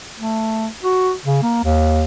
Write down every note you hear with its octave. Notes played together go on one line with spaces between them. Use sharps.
A3
F#4
C#3
A#3
D#2